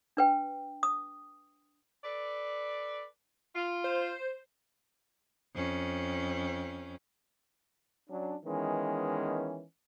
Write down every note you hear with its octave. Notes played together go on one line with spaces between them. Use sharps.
D4 B4 G5
D#6
A4 B4 D5
F4
C5
F2 C#4
F#3 C#4 D4
D#3 E3 G#3 B3 C#4